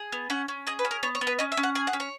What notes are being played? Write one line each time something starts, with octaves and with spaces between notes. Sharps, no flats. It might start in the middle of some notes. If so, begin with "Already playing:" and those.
Already playing: G#4
B3
C#4 F#5
C#4
G#4 D#5
B4
C#4
A#4
B3 C#5
C#5
B3
B4
C#4 D#5
E5
C#4
F#5
G#4 G#5
F#5
C#4
C#5